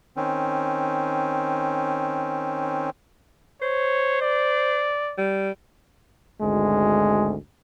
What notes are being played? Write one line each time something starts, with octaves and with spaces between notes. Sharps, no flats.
D#3 C4 C#4
C5 C#5
D5
G3
G#1 D2 G#3